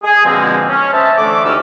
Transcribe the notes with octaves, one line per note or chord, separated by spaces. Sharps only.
G#4
B2 D3 F3 G#3 A#3 C4
C#4
C5 D#5 E5 A5
D3 E3 A3 D5 D6
D2 C#4 D#4 G4 E6